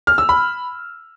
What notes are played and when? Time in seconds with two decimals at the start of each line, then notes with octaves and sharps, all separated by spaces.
0.07 F6
0.18 E6
0.29 B5